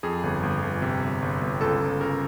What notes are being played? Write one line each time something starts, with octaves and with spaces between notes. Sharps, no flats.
F2 G#4
G1
G1
G1
C3
G1
G1
G1
C#2 A4
C#2
C#3 A#4